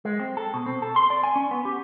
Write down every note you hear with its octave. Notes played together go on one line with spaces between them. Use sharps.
G#3
C4
A4
B2
C4
A4
C6
D5
G#5
C#4
B3
G4